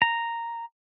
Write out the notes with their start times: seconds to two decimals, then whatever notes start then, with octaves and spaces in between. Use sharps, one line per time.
0.02 A#5